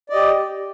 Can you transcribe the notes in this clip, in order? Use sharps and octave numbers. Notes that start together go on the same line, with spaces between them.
G4 D5 D#5